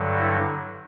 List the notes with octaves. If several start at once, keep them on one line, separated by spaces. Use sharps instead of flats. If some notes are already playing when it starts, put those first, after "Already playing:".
Already playing: G2 D3 F#3
E4